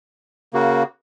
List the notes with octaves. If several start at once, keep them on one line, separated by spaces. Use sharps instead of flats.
C#3 A#3 F#4